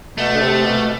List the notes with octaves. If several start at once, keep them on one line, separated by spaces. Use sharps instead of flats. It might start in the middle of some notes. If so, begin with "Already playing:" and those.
B2 A3
D3
C3
B2